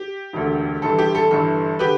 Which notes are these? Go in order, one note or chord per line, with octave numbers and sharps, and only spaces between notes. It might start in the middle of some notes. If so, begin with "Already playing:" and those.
Already playing: G4
E1 D2 D3
G1 G2 E3 A4
G4
A4
G1 G2 E3 A4
D3 G4 B4